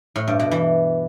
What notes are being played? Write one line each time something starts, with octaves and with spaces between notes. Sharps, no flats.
A2
G2
B2
E3